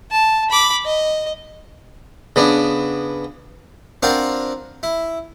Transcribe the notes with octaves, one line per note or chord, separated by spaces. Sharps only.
A5
B5 D6
D#5
C#3 B3 D4
C4 D4 F4 F#4 A#4
E4